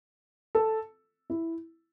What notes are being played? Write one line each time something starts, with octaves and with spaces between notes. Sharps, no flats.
A4
E4